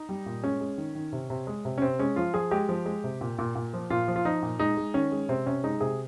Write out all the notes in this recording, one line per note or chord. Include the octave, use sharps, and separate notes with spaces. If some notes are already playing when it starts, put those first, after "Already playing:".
Already playing: D#4
G3
A#2
G#3 C#4
G#3
D#3
D#3
C3
C3
G#3
C3
C#4
C3 C4
G#3 C#4
F3 F4
F3 G#4
G#3 G4
F3
G#3
C3
A#2
A#2
A#2
F3
A#2 F4
F3
F4
F3 D#4
A#2
G#3 D#4
G#3
D#3 C#4
G#3
C3 C4
C3 C#4
G#3 D#4
C3 G#4